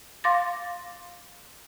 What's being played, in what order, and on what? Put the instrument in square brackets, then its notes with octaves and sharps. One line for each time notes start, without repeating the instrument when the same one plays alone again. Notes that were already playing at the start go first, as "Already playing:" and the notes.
[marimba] F5 C6 D6 A6 A#6